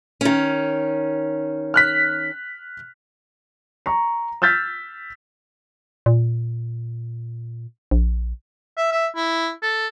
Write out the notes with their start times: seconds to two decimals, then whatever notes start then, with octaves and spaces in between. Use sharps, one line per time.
0.21 D#3 C#4
1.74 F6 F#6 B6
3.86 A#5 C#6
4.42 E6 F6 G6 A6 B6
6.06 A#2
7.91 A#1
8.77 E5
8.92 E5
9.16 E4
9.63 A4